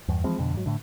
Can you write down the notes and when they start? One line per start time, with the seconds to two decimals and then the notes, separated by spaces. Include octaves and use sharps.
0.08 E2 G2
0.24 E3 F3 G#3 C4
0.39 F2 B2 D3
0.54 G#2 F#3
0.66 A2 D3